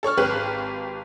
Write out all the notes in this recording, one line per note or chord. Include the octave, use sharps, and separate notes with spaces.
A4 C#5 C#6 F6
G#1 G4 B4 F#6